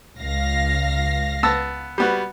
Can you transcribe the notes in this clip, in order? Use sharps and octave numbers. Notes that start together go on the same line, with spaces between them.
C#2 F5 A#6
B3 A5 E6
G3 B3 F#4